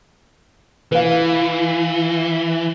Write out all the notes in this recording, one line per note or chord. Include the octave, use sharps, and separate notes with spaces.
E3 B4 F5